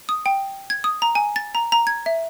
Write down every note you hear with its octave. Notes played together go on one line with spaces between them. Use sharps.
D#6
G5
G#6
D#6
A#5
G#5
A6
A#5
A#5
G#6
E5